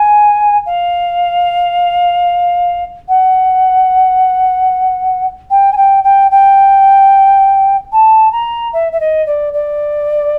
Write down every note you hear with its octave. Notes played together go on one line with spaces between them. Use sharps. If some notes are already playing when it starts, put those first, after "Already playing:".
Already playing: G#5
F5
F#5
G5
G#5
G5
G5
G5
A5
A#5
E5
E5
D#5
D5
D5